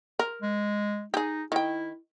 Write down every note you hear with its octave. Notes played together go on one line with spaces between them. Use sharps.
A#4
G#3
D#4 G4 G#4
D#3 E4 G5